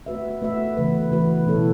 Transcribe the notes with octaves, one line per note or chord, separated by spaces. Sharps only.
A3 F#4 B4 E5
A3 F#4 B4 E5
C#3 E3 A3 F#4 B4
C#3 E3 A3 F#4 B4
B2 A3 E4 A4 C#5